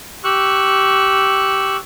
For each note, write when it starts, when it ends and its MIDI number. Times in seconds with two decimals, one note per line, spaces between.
0.24 1.77 67
0.24 1.77 85
0.24 1.77 88
0.24 1.77 90